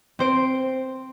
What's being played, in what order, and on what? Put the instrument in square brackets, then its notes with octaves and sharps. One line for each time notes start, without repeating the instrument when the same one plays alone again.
[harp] C4 C5 D7